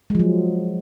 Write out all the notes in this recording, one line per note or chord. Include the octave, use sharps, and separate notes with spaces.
F3 F#3 G#3